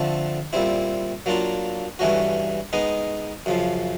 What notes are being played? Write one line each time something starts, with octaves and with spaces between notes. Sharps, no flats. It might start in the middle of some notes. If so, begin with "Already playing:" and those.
Already playing: D3 F3 A3 C4
A#2 G3 C4 E4
F#3 A#3 D4 F4
G2 E3 A3 C#4 F#4
G#3 B3 D#4
F#2 C#3 F3